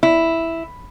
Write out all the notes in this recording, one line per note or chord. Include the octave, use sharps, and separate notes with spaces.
E4